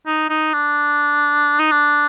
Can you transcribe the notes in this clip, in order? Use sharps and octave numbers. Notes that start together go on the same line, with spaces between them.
D#4
D#4
D4
D#4
D4